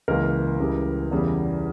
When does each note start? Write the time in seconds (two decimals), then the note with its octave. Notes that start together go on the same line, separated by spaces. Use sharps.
0.08 C#2 C#3 E3 A#3 A#4
0.60 C#2 C#3 E3 G3
1.11 E2 C#3 E3 G3